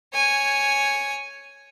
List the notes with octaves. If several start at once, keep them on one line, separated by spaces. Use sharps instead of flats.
C#5 G#5